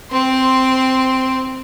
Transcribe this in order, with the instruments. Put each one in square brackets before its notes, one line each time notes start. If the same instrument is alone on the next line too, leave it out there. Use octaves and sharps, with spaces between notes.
[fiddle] C4 C6